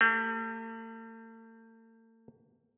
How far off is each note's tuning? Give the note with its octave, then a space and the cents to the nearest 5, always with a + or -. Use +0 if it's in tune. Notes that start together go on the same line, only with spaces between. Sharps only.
A3 +45 G4 +20